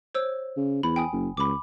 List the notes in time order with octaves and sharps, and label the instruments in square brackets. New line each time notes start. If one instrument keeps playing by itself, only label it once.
[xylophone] C5 C#5 E6
[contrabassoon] C#3
[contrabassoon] E2 [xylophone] B5
[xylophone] G5 G#5 D#6
[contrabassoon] F#1
[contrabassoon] C#2 [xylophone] B5 D6